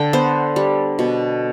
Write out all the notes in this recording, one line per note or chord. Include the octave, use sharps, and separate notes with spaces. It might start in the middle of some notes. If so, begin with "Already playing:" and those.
Already playing: D3 G5
B3 C5
G3
B2